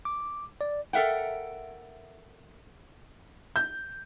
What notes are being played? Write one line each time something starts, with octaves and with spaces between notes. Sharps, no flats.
D6
D5
A4 A#4 E5 F#5 G5
G6